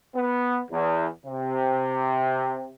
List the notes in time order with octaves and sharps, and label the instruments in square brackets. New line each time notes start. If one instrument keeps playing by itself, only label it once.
[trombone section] B3
E2
C3